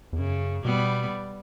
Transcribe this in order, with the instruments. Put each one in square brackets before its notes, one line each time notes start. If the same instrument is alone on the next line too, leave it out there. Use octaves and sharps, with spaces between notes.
[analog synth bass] E2
[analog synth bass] F#2 [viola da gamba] C#3
[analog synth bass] B2 [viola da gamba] G3 B3